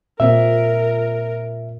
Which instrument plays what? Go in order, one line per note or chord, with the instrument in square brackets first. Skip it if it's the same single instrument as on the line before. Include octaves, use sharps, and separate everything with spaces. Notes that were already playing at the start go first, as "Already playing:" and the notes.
[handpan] A#2 A#3 C4 [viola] A#4 [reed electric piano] E5